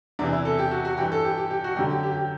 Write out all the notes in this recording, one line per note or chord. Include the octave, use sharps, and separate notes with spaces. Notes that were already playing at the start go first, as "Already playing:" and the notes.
E2 C3 E3 D4
E4
A4
G4
F#4
F#4
G2 E3 G4
A4
G4
G4
G4
F#4
F#2 D3 F#3 G4
G4
G4
G4